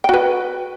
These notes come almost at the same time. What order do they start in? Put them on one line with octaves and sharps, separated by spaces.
G5 F#4 B4